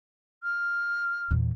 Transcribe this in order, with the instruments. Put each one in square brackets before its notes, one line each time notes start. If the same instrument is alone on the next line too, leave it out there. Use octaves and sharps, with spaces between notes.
[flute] F6
[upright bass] E2 A#2